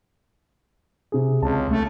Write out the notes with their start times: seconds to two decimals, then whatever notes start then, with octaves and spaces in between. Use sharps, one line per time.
1.12 C3 G#4
1.43 C#2 A5
1.71 A3